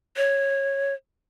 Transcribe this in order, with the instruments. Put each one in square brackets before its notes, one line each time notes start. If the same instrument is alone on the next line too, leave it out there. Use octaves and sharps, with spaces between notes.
[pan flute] C#5